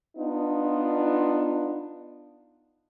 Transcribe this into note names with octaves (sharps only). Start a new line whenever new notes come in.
B3 D4 D#4 F4